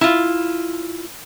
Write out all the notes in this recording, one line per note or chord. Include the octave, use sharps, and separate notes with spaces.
E4 F4